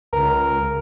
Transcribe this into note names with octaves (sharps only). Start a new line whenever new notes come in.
C#2 A#4